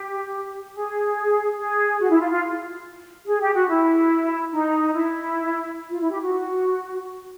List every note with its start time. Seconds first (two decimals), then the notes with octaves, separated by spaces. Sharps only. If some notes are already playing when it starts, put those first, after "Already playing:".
Already playing: G4
0.73 G#4
1.58 G#4
2.00 F#4
2.10 E4
2.21 F4
2.31 F4
3.26 G#4
3.41 G4
3.54 F#4
3.68 E4
4.53 D#4
4.94 E4
5.90 F4
6.01 E4
6.11 G4
6.21 F#4